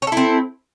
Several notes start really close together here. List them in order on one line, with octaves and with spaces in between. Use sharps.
C#5 A4 E4 C4